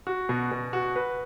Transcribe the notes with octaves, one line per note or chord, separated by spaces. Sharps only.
F#4
B2
B2
F#4
B4